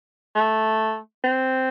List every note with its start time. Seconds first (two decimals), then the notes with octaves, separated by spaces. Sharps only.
0.36 A3
1.24 C4